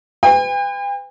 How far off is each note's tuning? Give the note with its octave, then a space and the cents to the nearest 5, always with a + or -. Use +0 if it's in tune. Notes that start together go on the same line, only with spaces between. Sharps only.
B4 +35 G5 +45